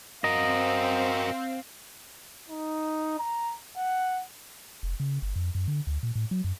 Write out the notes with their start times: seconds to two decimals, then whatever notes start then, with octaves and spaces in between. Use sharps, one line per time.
0.24 C4 F#4 A#4 D#5 F5
2.50 D#4
3.18 A#5
3.77 F#5
4.83 F1
5.00 C#3
5.22 G1
5.36 F2
5.55 F#2
5.68 D3
5.87 D2
6.03 A#2
6.16 A2
6.31 F#3
6.44 F#2